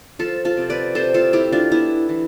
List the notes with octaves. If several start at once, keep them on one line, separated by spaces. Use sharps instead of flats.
F3 F4 A4
F4 A4
C3
B4 D5
C3 A4 C5
F4 A4
A3 E4 G4
D4 F4
B3 E4
E3